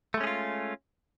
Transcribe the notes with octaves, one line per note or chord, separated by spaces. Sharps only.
G#3 A3 C#4 F4 G#4